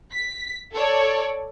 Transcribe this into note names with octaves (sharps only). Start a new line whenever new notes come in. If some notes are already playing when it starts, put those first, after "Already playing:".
B6
A4 C#5 D5